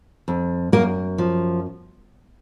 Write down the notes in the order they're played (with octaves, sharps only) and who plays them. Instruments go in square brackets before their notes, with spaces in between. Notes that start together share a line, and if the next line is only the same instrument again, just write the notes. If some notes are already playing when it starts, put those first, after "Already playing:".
[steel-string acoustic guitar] F2
F#2 A#3 A#4
F3